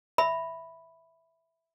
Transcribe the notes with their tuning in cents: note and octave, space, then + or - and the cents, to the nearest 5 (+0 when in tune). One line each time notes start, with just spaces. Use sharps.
E5 +0 B5 +0